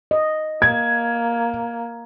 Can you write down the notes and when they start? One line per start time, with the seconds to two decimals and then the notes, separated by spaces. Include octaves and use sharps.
0.11 D#5
0.62 A#3 G#6